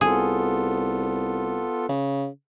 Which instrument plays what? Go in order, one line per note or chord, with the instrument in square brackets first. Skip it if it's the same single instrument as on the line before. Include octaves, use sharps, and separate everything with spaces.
[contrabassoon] C2 [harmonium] B3 F4 A4 [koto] G#4
[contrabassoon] C#3